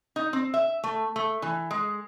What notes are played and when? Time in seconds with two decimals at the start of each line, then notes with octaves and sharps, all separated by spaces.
0.16 D#4
0.33 C4
0.54 E5
0.84 A3
1.16 A3
1.42 E3
1.71 G#3